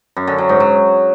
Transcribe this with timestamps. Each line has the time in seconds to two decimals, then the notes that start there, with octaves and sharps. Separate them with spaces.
0.17 F#2
0.27 D3
0.38 F#3
0.49 G#2
0.60 F#3